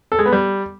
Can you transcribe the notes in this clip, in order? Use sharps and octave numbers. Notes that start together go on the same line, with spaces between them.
A4
G#3
B3
G3